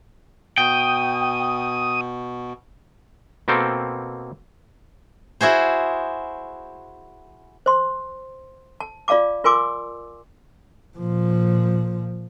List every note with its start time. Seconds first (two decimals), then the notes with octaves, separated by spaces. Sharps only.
0.58 B2 G5 D#6
3.48 B2 A#3 C4 A4 G5
5.41 E4 F#4 G#4 C5
7.66 C5 C6
8.80 A5
9.08 F4 D5 F5 A5 D6
9.44 F4 A#4 G#5 C6 D6 E6
10.98 A#2 F3